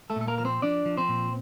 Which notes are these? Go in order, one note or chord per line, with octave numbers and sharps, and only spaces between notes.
A3 A4
A#2
A4
A#3 A#4
F3 A#4
C4 C5
F3 D4 D5
F3
C4 C5
A#2